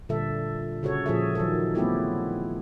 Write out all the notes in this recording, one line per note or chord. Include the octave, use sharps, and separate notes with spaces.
A#2 D3 G3 A4 E5
C#3 F#4 A4 C#5
A#2 F3 G#4 A4 E5
D#3 F#3 A4
A3 B3 C4 E4 G4 A4